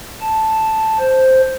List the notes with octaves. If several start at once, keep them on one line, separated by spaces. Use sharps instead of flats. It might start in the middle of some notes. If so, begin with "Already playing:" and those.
A5
C5